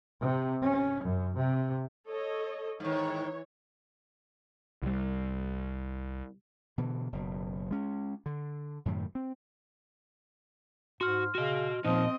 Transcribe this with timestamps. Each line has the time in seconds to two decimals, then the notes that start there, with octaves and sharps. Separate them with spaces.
0.21 C3
0.62 C#4
1.02 F#2
1.36 C3
2.07 A4 C#5 D#5
2.80 G#2 D#3 E3 C#5
4.82 C2 G3
6.78 B2 D3 E3
7.12 F#1 B2
7.71 G#3 C#4
8.26 D3
8.85 F#2 A2 C3 D#3
9.15 C4
11.01 G#2 F#4 C6 F6
11.35 C#3 F#4 D#5
11.85 A#2 F3 C4 D#4 D#5